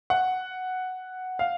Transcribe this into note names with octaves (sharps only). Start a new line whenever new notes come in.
F#5
F5